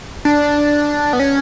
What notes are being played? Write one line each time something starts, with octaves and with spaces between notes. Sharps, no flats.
D4
B3
C#4